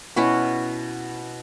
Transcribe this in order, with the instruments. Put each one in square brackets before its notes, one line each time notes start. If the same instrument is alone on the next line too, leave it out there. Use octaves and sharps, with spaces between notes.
[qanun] B2 C#4 E4 F#4